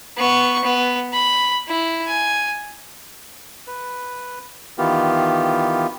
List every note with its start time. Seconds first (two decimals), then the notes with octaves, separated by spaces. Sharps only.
0.17 B3 C#6
0.64 B3
1.13 B5
1.68 E4
2.07 G#5
3.67 B4
4.78 D#3 E3 B3 F4 G4